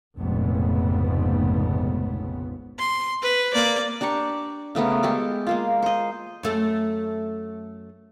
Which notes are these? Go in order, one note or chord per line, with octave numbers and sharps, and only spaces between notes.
F1 A#1 F2 G#2 C#3 B3
C6
B4
A#3 D5
D4 G4 A#5 C#6
C#3 A3 B3 A#4
G#3 G4 A4 D6
G#3 A#3 F4
C5 D#5
F#2 A3 A4